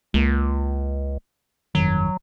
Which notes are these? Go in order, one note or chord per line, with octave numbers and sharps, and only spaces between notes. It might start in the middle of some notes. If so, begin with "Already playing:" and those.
C#2 G#3 A#3
G1 F2 D#3 F#3